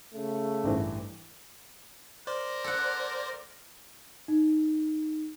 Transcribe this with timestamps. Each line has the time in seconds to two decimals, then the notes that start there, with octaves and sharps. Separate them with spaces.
0.14 C#3 A3
0.64 A1 G2 E3
2.27 A#4 C5 D5
2.64 A4 F#5
4.28 D#4